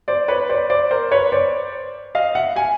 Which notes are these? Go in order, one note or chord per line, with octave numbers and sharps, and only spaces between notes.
C5 D5
B4 C#5
C5 D5
C5 D5
A#4 C5
B4 C#5
C5 D5
D#5 F5
E5 F#5
F#5 G#5